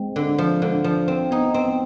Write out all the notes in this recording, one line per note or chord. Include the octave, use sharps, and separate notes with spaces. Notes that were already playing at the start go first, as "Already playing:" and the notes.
Already playing: G#3 C4
D3
F3
D3
F3
C4
B3 D#4
C4